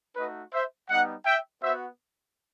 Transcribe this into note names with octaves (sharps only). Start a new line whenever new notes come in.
A3 D#4 F#4 B4 D#5
C5 E5
G3 B3 D#4 D#5 F#5
E5 G5
B3 F#4 C5 E5